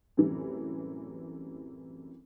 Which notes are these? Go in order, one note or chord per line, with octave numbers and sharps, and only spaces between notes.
F#2 A2 C3 E3 G3